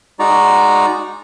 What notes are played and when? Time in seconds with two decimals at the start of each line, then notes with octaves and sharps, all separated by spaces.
0.19 G#3 D#4 F#4 D5 A#5